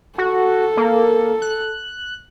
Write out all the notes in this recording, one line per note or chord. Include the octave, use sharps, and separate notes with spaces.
F#4 A4
A#3
F#6